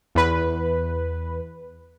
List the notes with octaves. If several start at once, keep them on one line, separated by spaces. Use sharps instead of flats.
E2 B4